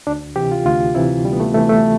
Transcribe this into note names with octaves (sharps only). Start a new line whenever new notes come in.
D2 D4
C3 E3 G4
F4
D2 F4
C3 E3 E4
D2 G3
B3
A3
C3 E3 A3
A3